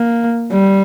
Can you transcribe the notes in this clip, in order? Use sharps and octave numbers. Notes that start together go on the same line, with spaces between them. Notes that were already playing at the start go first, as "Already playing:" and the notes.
Already playing: A#3
G3